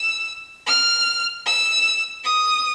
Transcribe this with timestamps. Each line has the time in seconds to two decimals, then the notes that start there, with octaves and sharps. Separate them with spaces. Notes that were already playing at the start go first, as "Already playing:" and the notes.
Already playing: E6
0.67 F6
1.46 E6
2.24 D#6